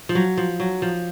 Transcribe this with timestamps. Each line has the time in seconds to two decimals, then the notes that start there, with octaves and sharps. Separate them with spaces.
0.09 F3
0.15 F#3
0.37 F3
0.60 F#3
0.82 F3